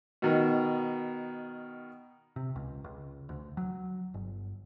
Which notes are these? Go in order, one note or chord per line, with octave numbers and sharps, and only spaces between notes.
B2 D#3
C3
C#2
C#2
D2
F#3
G1